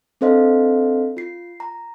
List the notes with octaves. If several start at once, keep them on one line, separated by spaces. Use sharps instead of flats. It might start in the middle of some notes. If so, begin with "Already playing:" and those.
C4 D4 A4 C5 D#5 F5
F4 C7
A#5